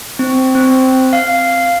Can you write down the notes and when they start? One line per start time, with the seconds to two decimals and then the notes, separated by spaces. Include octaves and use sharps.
0.19 C4
0.55 C4
1.13 F5